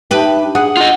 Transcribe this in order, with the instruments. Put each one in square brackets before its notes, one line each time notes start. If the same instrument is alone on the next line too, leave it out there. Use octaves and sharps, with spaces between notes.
[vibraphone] D#4 E5 A5 [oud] G4 B4
[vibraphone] D4
[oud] G#4 [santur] F#5
[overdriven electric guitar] F4 D#5